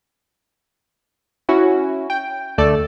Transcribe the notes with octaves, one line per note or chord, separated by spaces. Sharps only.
C#4 E4 F#4
G5
D2 A3 A4 D5